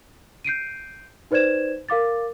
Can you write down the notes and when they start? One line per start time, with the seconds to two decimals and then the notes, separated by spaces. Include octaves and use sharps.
0.45 G6 C7 D7 D#7
1.31 D#4 B4 C5 D5 G#6 E7
1.89 A#4 F5 D6 A6